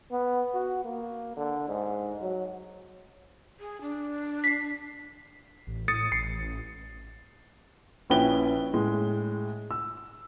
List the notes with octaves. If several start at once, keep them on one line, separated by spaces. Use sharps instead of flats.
B3
F#4
A#3
D3
G#2
F#3
G#4
D4
B6 C7
A1
A2 D#6 A6 C#7
A1 C7
A#1 C#4 E4 B4 G5 G7
A2 G#3
E6